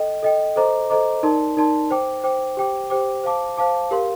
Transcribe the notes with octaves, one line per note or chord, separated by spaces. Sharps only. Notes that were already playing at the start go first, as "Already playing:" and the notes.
Already playing: A4 D#5 G5
A4 D#5 G5
A4 C5 D#5 A#5 D6
A4 C5 D#5 A#5 D6
D#4 A#4 D5 A5 C6
D#4 A#4 D5 A5 C6
C5 G5 D6
C5 G5 D6
G4 C5 G5 D6
G4 C5 G5 D6
C5 F5 A5 D6
C5 F5 A5 D6
G4 A#4 F5 C6